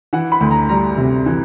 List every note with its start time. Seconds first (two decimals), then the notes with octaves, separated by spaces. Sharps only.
0.13 E3 F#5
0.32 B5
0.41 D2
0.51 A#5
0.69 G3 A#5
0.98 C3
1.26 E3